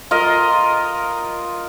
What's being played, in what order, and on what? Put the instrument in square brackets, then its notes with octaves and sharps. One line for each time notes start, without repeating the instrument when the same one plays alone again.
[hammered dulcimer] F4 A#4 D#5 F5